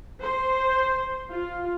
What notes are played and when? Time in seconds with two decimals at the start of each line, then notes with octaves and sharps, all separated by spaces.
0.21 C5
1.31 F4